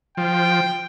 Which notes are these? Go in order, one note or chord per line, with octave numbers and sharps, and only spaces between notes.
F3 G5